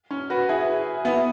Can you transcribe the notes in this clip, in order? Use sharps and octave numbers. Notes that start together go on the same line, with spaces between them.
C#4
F#4 B4
E4 G#4
B3 E4